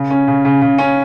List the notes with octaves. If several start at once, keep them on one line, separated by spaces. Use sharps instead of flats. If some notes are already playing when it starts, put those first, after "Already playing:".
Already playing: C#3
C#4
C#3
C#3
C#3
C#4